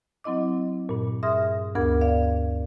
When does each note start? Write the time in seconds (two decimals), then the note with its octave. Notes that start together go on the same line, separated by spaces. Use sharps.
0.24 F#3 C4 E4 D#5 D6
0.89 G2 A#2
1.23 G#4 E5 C6 D#6 F6 A#6
1.75 D2 G2 B3 A#4 D6 G#6
2.01 D5 F5